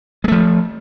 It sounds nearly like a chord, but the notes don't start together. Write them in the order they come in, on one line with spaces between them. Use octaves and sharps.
G#3 A3 F3